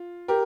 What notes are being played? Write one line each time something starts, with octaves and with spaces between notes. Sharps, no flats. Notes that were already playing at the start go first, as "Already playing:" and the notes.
Already playing: F4
G4 A#4